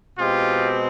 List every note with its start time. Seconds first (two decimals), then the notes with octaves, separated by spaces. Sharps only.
0.18 B2 G#3 C4 F4 G4